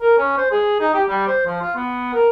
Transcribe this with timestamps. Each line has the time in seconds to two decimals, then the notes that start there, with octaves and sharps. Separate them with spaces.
0.01 A#4
0.18 C#4
0.37 C5
0.51 G#4
0.80 D#4
0.94 G4
1.08 G3
1.27 C5
1.46 F3
1.61 F4
1.75 B3
2.13 A#4